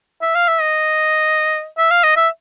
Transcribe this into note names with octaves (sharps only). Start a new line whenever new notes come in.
E5
F5
E5
D#5
E5
F5
D#5
E5